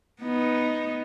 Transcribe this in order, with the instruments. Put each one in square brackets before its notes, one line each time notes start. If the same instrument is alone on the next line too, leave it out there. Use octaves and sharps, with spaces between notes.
[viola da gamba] B3 D#4